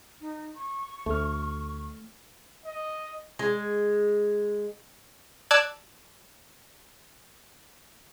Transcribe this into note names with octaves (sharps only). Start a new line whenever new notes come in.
D#4
C#6
D2 A3 F6
D#5
G#3
D5 A5 E6 F#6 G#6